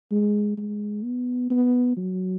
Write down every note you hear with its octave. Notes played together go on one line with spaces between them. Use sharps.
G#3
G#3
B3
B3
F#3